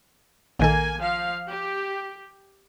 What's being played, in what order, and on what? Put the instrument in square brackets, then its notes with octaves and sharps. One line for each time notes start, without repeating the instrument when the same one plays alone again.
[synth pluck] A#1 D#3 A4 [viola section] A#3 G#5
[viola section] F3 F5
G4